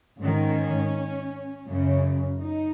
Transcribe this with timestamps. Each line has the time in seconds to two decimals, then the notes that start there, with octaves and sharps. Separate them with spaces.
0.20 G#2 D#3 C#4
1.67 F#2 C#3
2.41 D#4